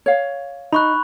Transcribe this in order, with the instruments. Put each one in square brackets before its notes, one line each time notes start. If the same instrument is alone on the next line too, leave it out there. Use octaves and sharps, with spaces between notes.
[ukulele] C#5 F5
[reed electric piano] D#4 [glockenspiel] B5 C#6 F#6